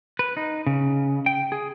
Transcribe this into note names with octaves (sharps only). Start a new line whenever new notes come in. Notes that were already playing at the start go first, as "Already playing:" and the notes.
B4
D#4
C#3
G5
G#4